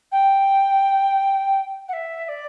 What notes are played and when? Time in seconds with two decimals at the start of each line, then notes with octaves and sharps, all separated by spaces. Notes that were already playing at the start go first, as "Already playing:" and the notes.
0.11 G5
1.88 F#5
1.93 E5
2.24 E5
2.28 D5